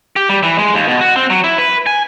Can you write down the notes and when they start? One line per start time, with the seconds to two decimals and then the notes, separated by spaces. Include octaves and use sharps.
0.16 G4
0.29 G3
0.43 E3
0.58 G#3
0.74 D#2
0.88 B2
1.01 F#4
1.16 C4
1.30 F#3
1.44 E4
1.58 B4
1.86 G#5